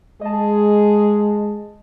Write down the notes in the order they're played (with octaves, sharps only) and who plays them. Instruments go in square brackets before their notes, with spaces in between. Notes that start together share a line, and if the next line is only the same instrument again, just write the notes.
[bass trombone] G#3 [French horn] G#4 [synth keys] D#5 A5